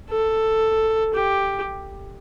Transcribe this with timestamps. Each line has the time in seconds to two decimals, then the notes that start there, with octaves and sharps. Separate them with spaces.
0.10 A4
1.14 G4